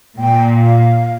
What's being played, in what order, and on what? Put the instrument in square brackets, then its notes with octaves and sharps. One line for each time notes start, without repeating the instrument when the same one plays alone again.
[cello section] A#2 [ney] G5
[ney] F5